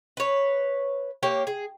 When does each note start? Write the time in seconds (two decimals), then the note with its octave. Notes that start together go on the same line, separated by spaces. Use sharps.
0.17 B4 C#5
1.23 A#3 G4 C#5
1.47 G#4